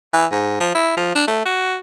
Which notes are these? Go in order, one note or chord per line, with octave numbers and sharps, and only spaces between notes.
E3
G#2
F3
E4
F3
D4
A3
F#4